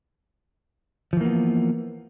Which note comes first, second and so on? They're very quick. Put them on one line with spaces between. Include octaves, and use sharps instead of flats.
F3 E3 A#3 B3